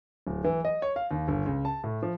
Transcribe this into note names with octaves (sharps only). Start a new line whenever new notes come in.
D1
E3
D#5
C#5
F5
D#2
G1
C#2
A5
A2
F3